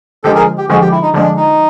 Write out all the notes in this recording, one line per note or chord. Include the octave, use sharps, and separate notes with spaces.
D3 F3 G#3 G4 A4
G#4 A#4
G4
D3 F3 G#3 F#4 G#4
G4
E4
D#4
D3 F3 G#3 D4
D#4